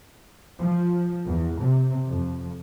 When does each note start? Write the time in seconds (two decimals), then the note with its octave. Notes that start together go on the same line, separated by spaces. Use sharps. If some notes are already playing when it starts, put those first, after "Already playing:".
0.59 F3
1.26 E2
1.62 C3
2.09 F2